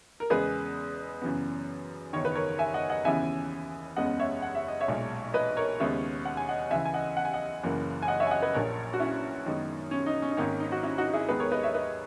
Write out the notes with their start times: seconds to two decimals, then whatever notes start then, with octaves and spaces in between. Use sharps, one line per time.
0.20 A#4
0.30 E2 C#3 G#3 B3 G#4 B4
1.22 F#2 C#3 E3 B3
2.13 F#1 E2 D#3 C#5
2.25 B4
2.35 A#4 C#5
2.59 E5 G#5
2.74 D#5 F#5
2.90 D#5 F#5
3.05 D#2 C#3 E3 B3 E5 G#5
3.96 F#1 E2 C#3 G#3 B3 D#5 F#5
4.20 C#5 E5
4.42 F#5
4.55 E5
4.68 D#5
4.80 C#5 E5
4.88 B1 A#2 G#3
5.34 B4 D#5
5.57 A#4 C#5
5.80 D#2 C#3 G#3 B3 C#5 E5
6.25 F#5
6.37 G#5
6.49 D#5 F#5
6.71 C#2 C#3 E3 E5 G#5
6.85 G#5
6.94 D#5 F#5
7.17 F#5
7.25 G#5
7.33 D#5 F#5
7.63 F#1 F#2 E3 A#3
8.02 G#5
8.08 D#5 F#5
8.20 C#5 E5
8.27 G#5
8.31 D#5 F#5
8.42 B4 D#5
8.54 A#1 A#2 A#3 A#4 C#5
8.94 F#4
9.00 C#4 E4
9.46 F#2 D#3 G#3 B3
9.91 C#4
10.06 D#4
10.22 C#4
10.31 D#4
10.37 G#1 G#2 D#3 A#3 C#4
10.60 D#4
10.72 F#4
10.83 C#4 E4
10.98 D#4 F#4
11.08 F#4
11.13 E4 G#4
11.29 D#2 D#3 G#3 B3 G#4 B4
11.40 A#4 C#5
11.52 B4 D#5
11.63 C#5 E5
11.74 B4 D#5